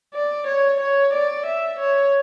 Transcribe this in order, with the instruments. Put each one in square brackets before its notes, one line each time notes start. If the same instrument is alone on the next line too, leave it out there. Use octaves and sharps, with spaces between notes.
[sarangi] D5
C#5
C#5
D5
E5
C#5